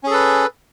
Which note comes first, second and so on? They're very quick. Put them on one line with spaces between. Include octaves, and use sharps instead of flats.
C#4 G#4 A4 B4